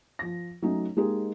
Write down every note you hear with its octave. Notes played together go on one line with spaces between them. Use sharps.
F3 A#6
F#3 A3 C#4 D#4
G#3 A#3 D#4 G4 G#4